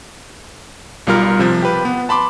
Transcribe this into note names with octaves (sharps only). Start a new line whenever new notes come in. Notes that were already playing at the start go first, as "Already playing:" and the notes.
B1 G3 F4 A#4 F6
C3 F3
G4 B4
B3
A5 B5 C6 D6